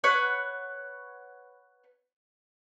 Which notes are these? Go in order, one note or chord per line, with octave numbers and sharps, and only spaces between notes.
B4 C#5 F#5